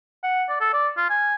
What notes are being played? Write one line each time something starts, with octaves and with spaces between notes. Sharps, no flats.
F#5
D5
A4
D5
F4
G#5